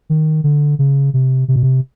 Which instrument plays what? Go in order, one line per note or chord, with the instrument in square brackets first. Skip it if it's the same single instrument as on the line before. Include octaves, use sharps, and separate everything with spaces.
[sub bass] D#3
D3
C#3
C3
C3
B2
C3